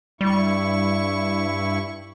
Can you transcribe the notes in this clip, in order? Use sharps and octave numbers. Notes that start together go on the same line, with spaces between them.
G2 G3 E4 C#6